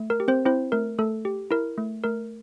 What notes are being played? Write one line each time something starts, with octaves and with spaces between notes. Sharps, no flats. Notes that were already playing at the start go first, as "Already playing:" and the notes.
Already playing: A3
A#4
G4
C4 C5
C4 E4 C5
A3 A#4
A3 A4
G4
E4 A#4
A3
A3 A#4